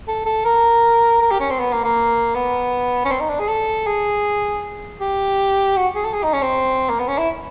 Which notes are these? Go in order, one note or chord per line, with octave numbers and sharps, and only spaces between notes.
A4
A4
A#4
A#4
G4
C#4
C4
B3
A#3
A#3
B3
C#4
C4
D#4
D4
G#4
A4
G#4
G4
F#4
G#4
A4
G#4
D#4
C#4
C4
A#3
B3
C#4
E4